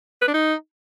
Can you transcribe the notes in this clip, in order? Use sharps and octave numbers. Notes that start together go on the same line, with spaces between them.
B4
D4
D#4